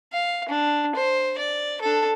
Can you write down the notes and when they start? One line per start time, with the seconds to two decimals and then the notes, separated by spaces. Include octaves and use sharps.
0.13 F5
0.49 D4
0.95 C5
1.39 D5
1.82 D4 A4